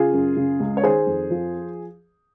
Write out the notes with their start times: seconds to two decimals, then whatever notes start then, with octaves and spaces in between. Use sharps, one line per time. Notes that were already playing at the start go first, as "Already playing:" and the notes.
Already playing: C#3 F4 G#4
0.13 F#2
0.37 C#3
0.60 C#2
0.77 C#5
0.83 D#3 G#4 C5
1.07 F2
1.31 F3